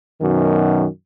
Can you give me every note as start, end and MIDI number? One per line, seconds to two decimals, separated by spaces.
0.21 0.86 42
0.21 0.86 47
0.21 0.86 51